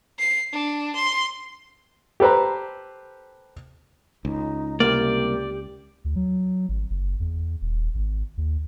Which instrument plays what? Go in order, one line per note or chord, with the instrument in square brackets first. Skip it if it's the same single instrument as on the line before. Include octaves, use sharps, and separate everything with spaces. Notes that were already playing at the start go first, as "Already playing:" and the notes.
[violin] C7
D4
C6
[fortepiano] G4 A4 B4 C5 A#5
[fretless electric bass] C#2 [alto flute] D#4
[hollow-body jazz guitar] C2 A#3 [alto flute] G4 [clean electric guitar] D5
[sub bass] D2
F#3
G#1
F#1
E2
D#1
G#1
D#2